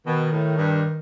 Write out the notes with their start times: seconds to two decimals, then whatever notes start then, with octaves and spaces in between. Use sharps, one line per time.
0.06 B2 D#3
0.32 A2
0.58 G2